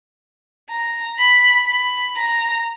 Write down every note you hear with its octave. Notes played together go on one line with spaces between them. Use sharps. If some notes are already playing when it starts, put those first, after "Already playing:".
A#5
B5
B5
A#5